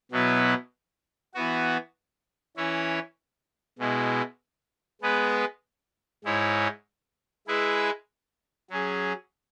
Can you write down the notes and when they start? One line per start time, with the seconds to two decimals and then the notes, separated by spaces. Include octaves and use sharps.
0.11 B2 F#3 B3 E4 B4
1.34 E3 B3 F#4
2.56 E3 C#4 E4 C#5
3.79 B2 G#3 E4
5.02 G#3 B3 G#4 B4
6.24 G#2 G#3 E4 C#5
7.47 G#3 E4 G#4 B4 E5
8.70 F#3 C#4 G#4